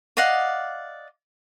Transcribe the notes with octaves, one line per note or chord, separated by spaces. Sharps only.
D5 D#5 F5 F#5